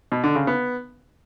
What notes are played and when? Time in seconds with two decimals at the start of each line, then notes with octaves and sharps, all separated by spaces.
0.12 B2
0.23 D3
0.35 C#3
0.47 B3